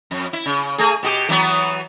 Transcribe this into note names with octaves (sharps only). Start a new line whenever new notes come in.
F2
E4
C#3
A3 G#4
B2 F#4 G4
E3 F#3 B3